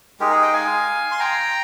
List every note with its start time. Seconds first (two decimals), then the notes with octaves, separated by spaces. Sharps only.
0.20 G#3 D#4 G4 A#4
0.31 G#4
0.42 D#5 G5
0.53 F5 G#5
1.12 C6
1.20 G5 A#5